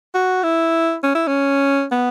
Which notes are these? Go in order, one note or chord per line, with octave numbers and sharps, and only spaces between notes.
F#4
E4
C#4
E4
C#4
B3